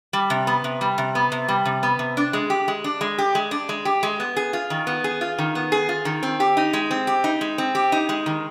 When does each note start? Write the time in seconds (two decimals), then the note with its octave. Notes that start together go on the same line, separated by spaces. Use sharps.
0.13 G3
0.30 C3
0.47 B3
0.64 C3
0.81 G3
0.98 C3
1.15 B3
1.32 C3
1.48 G3
1.65 C3
1.83 B3
1.99 C3
2.17 D4
2.33 G#3
2.50 G4
2.68 G#3
2.84 D4
3.01 G#3
3.18 G4
3.35 G#3
3.51 D4
3.69 G#3
3.85 G4
4.03 G#3
4.20 B3
4.36 G#4
4.53 F4
4.70 D#3
4.87 B3
5.04 G#4
5.21 F4
5.39 D#3
5.55 B3
5.72 G#4
5.89 F4
6.05 D#3
6.23 C4
6.40 G4
6.57 D#4
6.73 G#3
6.91 C4
7.07 G4
7.24 D#4
7.41 G#3
7.58 C4
7.75 G4
7.92 D#4
8.09 G#3
8.26 D#3